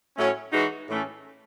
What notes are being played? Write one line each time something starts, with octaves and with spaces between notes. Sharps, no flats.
A2 F#3 A3 C#4
E3 G#3 D#4 F#4
A2 E3 A3 C#4